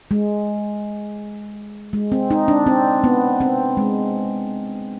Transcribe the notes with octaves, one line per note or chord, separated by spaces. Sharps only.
G#3
G#3
C4
D#4
D4
C4
B3
C4
G#3